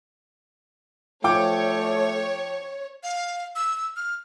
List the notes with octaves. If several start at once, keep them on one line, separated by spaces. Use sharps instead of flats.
F3 A3 C#5 G5 D6
F5
E6
F6